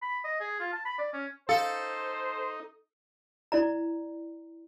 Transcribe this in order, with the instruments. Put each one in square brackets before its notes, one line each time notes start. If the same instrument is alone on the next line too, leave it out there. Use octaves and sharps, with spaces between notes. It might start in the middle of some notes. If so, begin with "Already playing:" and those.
[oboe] B5
D#5
G#4
F4
A5
B5
D5
C#4
[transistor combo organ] D#4 [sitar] A4 [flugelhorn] C5 [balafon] F5
[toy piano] E4 D5 A#5